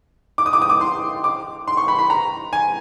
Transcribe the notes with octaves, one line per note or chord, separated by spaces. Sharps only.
D6
D#6
D6
D#6
D6
C6
D6
C6
C#6
B5
B5
A#5
G#5